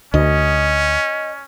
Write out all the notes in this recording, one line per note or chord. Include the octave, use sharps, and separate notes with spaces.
D2 C#4 D#5